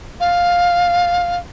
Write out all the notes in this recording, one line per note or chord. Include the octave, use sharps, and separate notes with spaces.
F5